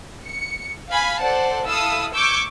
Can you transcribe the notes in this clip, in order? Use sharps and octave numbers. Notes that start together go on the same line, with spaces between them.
C#7
F5 G#5 B5
A4 C5 D5 F#5 A5
E4 A4 F5 B5 D#6 E6
C#6 D6 E6 G6 G#6 D7